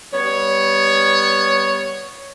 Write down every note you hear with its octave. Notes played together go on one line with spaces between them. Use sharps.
G3 B3 C#5